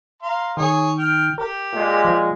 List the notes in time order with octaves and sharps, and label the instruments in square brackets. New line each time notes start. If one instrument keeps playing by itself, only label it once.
[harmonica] F5 A#5 C6
[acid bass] D#3 [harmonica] G#4 C#5 C#6
[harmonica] G5 F6
[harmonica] G4 [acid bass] A#4
[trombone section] A#2 G#3
[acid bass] F3